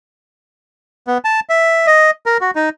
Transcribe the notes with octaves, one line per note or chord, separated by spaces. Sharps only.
B3
A5
E5
D#5
A#4
F#4
D#4